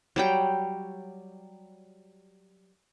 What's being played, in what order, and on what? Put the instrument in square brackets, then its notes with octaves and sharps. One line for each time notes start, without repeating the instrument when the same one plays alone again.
[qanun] F#3 G3 G5